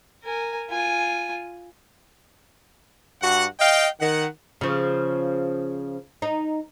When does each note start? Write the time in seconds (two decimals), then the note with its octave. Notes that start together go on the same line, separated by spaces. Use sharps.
0.23 A#4 G#5
0.70 F4 G#5
3.22 G2 F#4 F#5
3.60 D#5 F5 G5
4.01 D#3 F#5
4.61 C#3 F3
6.22 D#4